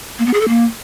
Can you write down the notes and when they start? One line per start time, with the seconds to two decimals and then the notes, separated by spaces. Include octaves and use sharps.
0.19 A#3
0.26 B3
0.34 G#4
0.41 A4
0.48 A#3